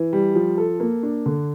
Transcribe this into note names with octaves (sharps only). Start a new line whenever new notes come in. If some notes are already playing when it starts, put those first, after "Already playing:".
Already playing: E3
G3
F3
A4
A#3
D4
D3